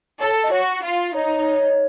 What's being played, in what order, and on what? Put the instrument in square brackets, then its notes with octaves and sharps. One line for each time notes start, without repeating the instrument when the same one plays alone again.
[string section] A4 [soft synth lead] C#5
[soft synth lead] D#5
[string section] F#4 [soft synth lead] C#5
[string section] F4
[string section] D#4 [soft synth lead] C#5